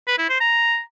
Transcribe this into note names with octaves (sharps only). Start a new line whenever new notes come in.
B4
E4
C5
A#5